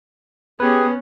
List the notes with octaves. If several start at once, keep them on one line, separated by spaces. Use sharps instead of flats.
B3 C#4 G4 G#4 B4